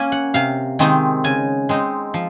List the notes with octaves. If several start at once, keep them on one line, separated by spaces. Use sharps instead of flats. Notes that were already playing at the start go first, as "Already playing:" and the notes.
Already playing: A#3 C#4 G#5
F#5
C3 F5
D#3 G#3 C4 D#4
C#3 G#5
G#3 C4 D#4
F3